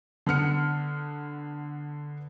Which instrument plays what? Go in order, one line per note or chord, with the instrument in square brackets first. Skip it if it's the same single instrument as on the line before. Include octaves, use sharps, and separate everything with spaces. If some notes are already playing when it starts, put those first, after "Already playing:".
[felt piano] D3 B3 F6 C#7